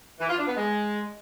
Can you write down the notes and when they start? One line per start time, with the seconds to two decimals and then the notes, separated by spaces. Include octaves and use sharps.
0.20 E3
0.29 F4
0.38 D4
0.47 B3
0.56 G#3